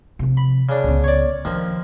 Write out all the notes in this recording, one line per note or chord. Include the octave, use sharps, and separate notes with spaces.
C3 F3
B5
C#3 D4
C#2 B3
C#5 D5
D#2 D3 F3